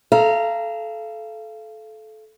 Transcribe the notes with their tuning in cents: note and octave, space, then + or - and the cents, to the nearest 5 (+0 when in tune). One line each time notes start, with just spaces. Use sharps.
A4 -20 F5 -30 A#5 +0